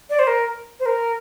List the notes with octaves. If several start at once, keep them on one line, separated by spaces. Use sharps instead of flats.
D5
C5
A#4
C5
A#4